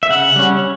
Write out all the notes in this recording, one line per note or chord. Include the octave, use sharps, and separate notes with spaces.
E5
C#3 F#5
G3 C#4